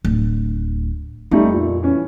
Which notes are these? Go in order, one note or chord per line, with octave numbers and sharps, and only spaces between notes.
D1
F2 G3 A3 D#4
A#2
E3 C#4